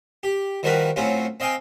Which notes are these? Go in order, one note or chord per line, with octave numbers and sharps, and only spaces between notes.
G4
D#3 F3 G3 F#4 A#4 B4
A2 F#3 C4 C#4 F4
C4 D#5 F5 G5 G#5